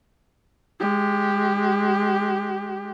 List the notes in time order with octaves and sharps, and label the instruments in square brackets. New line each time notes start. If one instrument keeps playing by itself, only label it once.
[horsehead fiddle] G#3 G4